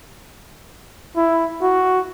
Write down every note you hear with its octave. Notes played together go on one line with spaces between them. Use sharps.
E4
F#4